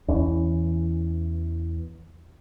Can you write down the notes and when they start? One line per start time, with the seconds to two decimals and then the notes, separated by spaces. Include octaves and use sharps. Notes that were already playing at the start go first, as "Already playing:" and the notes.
0.08 E2 E3 C#4